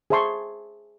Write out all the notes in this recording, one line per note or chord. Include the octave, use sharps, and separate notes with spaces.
G#4 C5 E5 A5 C6 C#6